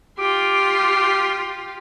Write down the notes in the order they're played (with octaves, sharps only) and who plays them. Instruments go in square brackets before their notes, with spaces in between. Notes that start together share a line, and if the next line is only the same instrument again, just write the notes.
[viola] F4 G4 [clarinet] D6